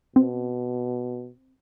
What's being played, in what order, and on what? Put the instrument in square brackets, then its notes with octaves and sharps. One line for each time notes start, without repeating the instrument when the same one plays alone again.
[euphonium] B2 [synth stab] C4